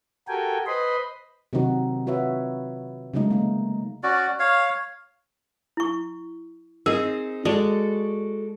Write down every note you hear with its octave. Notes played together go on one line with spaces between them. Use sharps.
F#4 G4 A4 A#4 G5 G#5
B4 C5 D#5 B5 C6
C3 D#3 F#3 C4 D#4 F#4
F4 F#4 B4 C#5 E5
C#3 F#3 G#3 A3 D#4
A#3 D#4
C#4 F#4 D5
C#5 F5
E4 C#6
C4 D#4 G#4 A#4
G#3 F#4 A4 D5